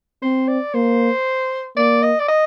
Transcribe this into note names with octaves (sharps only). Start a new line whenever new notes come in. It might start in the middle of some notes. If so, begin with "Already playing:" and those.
C4 C5
D5
A#3 C5
A#3 D5
D#5
D5
D#5